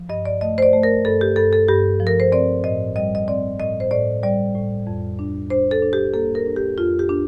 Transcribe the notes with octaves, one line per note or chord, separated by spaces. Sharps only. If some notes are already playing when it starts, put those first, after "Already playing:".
Already playing: F3
G2 D#5
D5
A3 D#5
C5
D5
A3
A#4
G2 A4
G4
G2 A4
A4
G2 G4
F3
A#4
C5
C4 D5
A2 D#5
G3 D#5
D#5
C4 D5
A2 D#5
C5
A2 D5
G3 D5
A2
F2
D4
D4 C5
A4
D4
G4
A#3 A4
A#4
D4
G4
F2 F4
G4
D4